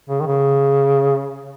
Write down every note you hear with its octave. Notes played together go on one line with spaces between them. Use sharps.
C#3
D#3
C#3